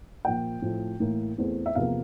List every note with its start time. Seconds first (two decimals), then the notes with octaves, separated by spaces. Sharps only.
0.25 A#2 F3 A#3 G5
0.62 A2 F3 A3 C4
1.00 A2 E3 A#3
1.38 E2 E3 A3 C4
1.66 E5
1.75 E2 C3 F3 A#3 F5